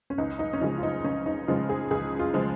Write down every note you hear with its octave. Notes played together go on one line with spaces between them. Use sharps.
C#4
C#2 D#4
D#4
C#4
C#3 F3 G#3 D#4
F4
D#4
C#2 C#4
D#4
C#3 F3 G#3 F4
G#4
C#2 G#4
F4
C#3 F3 G#3